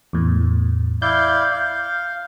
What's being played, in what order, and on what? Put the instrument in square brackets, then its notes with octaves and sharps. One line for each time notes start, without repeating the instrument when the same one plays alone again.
[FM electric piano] E2 A2
[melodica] E4 D5 F5 [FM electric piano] G6
[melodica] F5